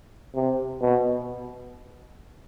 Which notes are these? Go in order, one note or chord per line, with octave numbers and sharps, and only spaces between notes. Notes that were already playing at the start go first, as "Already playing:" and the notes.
C3
B2